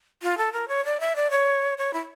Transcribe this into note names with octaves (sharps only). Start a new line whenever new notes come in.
F4
A4
A#4
C#5
D5
E5
D5
C#5
C#5
E4